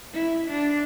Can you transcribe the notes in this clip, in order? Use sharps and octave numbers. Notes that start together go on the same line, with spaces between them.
E4
D4